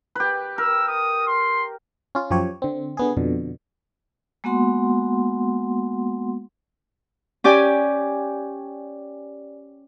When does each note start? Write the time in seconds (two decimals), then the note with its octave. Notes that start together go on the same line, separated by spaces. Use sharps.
0.15 G4 B4
0.58 A#4 E6
0.88 D#6
1.27 C6
2.15 C#4 F4
2.30 F#2 F3 G4 C#5
2.62 D3 C4
2.97 D3 B3 G#4
3.17 F2 B2 D3
4.44 G#3 A#3 B3 F#4 F#5 C6
7.44 C#4 G4 D5 G5 G#5